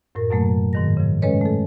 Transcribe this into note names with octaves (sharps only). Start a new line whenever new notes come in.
F#2 A2 A#4
F#2 B2 F#3 A3 A#3
G#2 D#3 A#6
C#3 F3
G#3 C#4 A4 B4 C#5 D#5
A3 A4